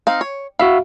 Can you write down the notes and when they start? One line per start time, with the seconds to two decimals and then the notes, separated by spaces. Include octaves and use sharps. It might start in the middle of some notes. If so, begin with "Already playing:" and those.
0.07 C4 D#4 F5
0.21 C#5
0.59 E4 F#4 E5 F5